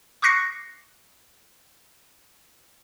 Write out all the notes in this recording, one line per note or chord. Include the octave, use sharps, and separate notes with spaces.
C#6 D6 F#6 A#6 C7 C#7